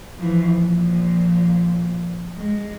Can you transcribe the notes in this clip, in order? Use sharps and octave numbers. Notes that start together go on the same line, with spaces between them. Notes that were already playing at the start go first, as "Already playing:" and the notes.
E3 F3
A#2 F3
G#3